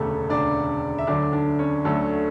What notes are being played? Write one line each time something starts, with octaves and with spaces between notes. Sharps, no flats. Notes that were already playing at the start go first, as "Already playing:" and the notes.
Already playing: E1 D2 C#3 A3 G4 A4
E1 D2 C#3 D4 D5
E5
D2 D3 F#3 A3 D4 D5
D4 D5
C#4 C#5
D2 D3 F#3 A3 A4